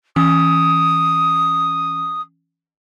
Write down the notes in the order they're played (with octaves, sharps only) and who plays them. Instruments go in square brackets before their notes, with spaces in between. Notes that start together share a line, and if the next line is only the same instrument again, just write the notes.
[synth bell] E3 C#4 E6 [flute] D#6